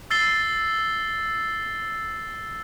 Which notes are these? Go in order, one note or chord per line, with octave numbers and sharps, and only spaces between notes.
E6 A6 C7 G7